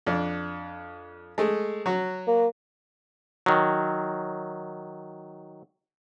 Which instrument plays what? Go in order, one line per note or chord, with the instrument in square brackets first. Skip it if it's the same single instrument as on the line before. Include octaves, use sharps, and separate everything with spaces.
[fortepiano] F2 D4
G#3 A3
F#3 F#4
[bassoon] A#3
[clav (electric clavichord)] D#3 F#3